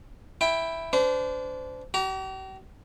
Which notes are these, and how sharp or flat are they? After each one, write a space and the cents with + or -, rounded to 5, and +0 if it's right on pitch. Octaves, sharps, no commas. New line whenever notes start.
E4 +0 G5 +10
D4 -25 C5 -35
G4 -45 A#5 +0